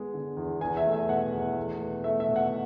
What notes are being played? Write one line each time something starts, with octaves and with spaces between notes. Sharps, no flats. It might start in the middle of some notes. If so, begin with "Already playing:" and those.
Already playing: G#3 B3
D3
E2
E2 G#5
E5
A3
E5
B2 F#5
E2
A3
B2
A3 E5
E5
B2
F#5